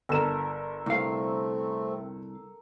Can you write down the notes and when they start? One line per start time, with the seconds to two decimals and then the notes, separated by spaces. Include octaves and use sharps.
0.09 G1 A4 A#4 E7
0.86 C2 A3 C4 F5